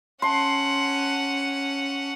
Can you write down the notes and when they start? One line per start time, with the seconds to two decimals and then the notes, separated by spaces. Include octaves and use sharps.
0.22 C#4 F#5 A5 C6